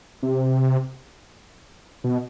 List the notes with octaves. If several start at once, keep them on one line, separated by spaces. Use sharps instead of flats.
C3
B2